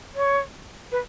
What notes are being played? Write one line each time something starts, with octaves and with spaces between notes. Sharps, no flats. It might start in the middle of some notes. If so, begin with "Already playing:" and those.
C#5
B4